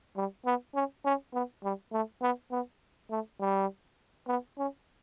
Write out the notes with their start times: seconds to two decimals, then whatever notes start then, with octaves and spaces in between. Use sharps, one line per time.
0.16 G3
0.45 B3
0.74 C#4
1.05 C#4
1.33 B3
1.63 G3
1.92 A3
2.22 B3
2.51 B3
3.10 A3
3.40 G3
4.28 B3
4.58 C#4